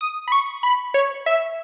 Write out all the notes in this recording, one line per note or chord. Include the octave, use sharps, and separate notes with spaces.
D#6
B5
C#6
B5
C#5
E5